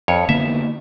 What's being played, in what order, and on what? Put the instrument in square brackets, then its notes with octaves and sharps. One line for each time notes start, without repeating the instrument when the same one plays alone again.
[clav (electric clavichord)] F2 C#5
[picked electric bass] D3 A#3 B3 [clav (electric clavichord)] E5